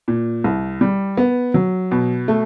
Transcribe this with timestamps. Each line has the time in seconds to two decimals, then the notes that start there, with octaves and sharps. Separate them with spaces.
0.08 A#2
0.44 C2
0.81 G3
1.17 B3
1.54 F#3
1.91 B2
2.28 A3